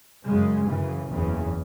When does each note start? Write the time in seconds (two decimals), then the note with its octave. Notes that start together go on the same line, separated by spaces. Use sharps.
0.25 F#2 C#3 G#3
0.67 F#2 C#3 E3
1.09 F#1 E2 C#3 E3